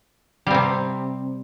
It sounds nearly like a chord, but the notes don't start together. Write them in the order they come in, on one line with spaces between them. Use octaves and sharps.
G3 C4 C3